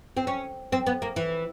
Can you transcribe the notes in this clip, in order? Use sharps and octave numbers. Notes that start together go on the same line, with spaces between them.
C4
C#4
C4
B3
A#3
E3